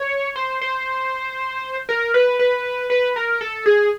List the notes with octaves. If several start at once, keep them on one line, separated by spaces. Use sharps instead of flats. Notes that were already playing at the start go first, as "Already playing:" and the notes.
Already playing: C#5
C5
C5
A#4
B4
B4
B4
A#4
A4
G#4